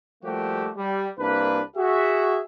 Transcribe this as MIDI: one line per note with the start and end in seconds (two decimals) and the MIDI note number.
0.23 0.70 53
0.23 0.70 55
0.23 0.70 57
0.23 0.70 58
0.23 0.70 66
0.23 0.70 67
0.76 1.07 55
1.19 1.61 36
1.19 1.61 58
1.19 1.61 62
1.19 1.61 71
1.76 2.42 66
1.76 2.42 68
1.76 2.42 76